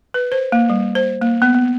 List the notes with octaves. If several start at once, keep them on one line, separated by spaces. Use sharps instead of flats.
B4
C5
A#3
G3
C5
A#3
B3
B3